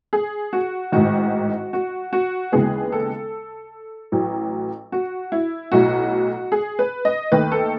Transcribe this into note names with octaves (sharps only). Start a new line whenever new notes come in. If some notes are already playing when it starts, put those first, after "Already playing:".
G#4
F#4
A1 G#2 D#3 F#4
F#4
F#4
D#2 C#3 E3 G#3 B3 G#4
A4
A1 A2 F#3
F#4
E4
B1 A2 F#3 F#4
G#4
B4
D#5
D#2 D#3 A3 B4
A4